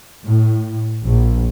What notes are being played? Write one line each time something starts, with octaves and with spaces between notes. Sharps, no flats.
A2
A#1